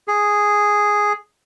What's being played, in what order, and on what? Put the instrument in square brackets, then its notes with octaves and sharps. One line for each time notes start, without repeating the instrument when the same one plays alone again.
[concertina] G#4